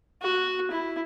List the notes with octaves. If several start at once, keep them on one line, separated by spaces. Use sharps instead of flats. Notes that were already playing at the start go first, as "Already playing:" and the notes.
F#4
E4